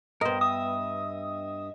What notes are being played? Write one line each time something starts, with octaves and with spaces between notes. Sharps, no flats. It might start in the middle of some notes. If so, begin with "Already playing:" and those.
G2 B3 A#4 C5 D#5
E5 D#6